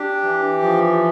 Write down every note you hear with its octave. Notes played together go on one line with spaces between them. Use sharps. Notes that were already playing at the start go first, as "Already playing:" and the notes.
Already playing: D4 G4
E3
F3